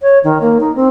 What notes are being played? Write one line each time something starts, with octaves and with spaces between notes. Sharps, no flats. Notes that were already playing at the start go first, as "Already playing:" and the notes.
C#5
D#3
A#3
D#4
C4